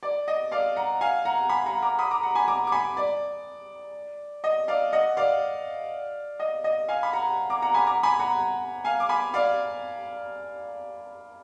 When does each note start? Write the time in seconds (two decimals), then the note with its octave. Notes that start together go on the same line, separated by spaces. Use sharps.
0.03 D5
0.28 D#5
0.52 D5 F5
0.76 F#5 A#5
1.01 F5 G#5
1.25 F#5 A#5
1.49 G#5 B5
1.66 F#5 A#5
1.82 A#5 D6
1.99 B5 D#6
2.11 A#5 D6
2.23 F#5 A#5
2.35 G#5 B5
2.48 A#5 D6
2.67 D6
2.72 G#5 B5
2.97 D5
4.44 D#5
4.68 D5 F5
4.92 D#5 F#5
5.17 D5 F5
6.40 D#5
6.64 D#5
6.88 F5 G#5
7.03 B5
7.13 F#5 A#5
7.50 A#5 D6
7.62 F#5 A#5
7.74 G#5 B5
7.87 A#5 D6
8.03 G#5 B5
8.19 F#5 A#5
8.85 F5 G#5
9.00 D6
9.09 G#5 B5
9.34 D5 F5